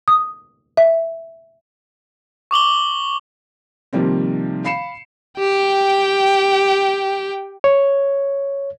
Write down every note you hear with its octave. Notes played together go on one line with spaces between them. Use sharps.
D#6
E5
C#6 D6 F#7 G7
C3 D#3 F3 G3 A#3 C4
F5 B5 C7 C#7 E7
G4 G5
C#5